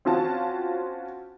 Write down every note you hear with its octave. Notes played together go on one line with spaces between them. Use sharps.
C4 C#4 F4 F#4 A5